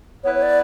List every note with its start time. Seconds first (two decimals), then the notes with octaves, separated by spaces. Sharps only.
0.24 B3 E4 B4 C#5
0.35 C#5
0.42 D5